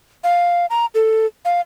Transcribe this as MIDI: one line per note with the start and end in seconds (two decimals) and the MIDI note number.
0.24 0.66 77
0.70 0.86 82
0.95 1.26 69
1.45 1.61 77